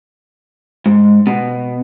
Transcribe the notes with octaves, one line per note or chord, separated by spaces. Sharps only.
G#2
B2